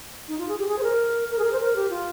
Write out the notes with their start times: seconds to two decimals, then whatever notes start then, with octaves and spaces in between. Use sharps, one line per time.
0.28 D#4
0.38 F4
0.49 G#4
0.59 G4
0.68 G#4
0.79 C5
0.83 A#4
1.30 A#4
1.39 G#4
1.44 A#4
1.53 C5
1.60 A#4
1.76 G4
1.90 F4